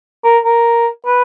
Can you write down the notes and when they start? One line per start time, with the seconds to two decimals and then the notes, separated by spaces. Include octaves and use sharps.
0.24 A#4
0.45 A#4
1.06 B4